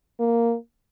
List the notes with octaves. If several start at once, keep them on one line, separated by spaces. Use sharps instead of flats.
A#3